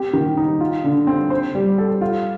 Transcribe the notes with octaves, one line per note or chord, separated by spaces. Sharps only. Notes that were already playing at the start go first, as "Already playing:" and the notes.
Already playing: C4 G4
D#3
D#4
F4
D3
C4
C5
G3
A4
F4